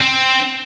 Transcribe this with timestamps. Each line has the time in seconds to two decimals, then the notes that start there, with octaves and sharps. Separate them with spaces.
0.01 C4